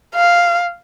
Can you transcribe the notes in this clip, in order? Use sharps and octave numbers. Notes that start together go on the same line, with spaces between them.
F5